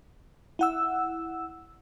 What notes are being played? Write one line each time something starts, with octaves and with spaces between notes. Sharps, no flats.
E4 F#5 E6